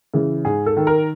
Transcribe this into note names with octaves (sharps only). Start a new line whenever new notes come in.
C#3 E3
G#2 G#4
A4
D#3
A#4